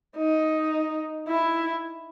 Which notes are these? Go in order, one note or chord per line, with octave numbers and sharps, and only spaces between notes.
D#4
E4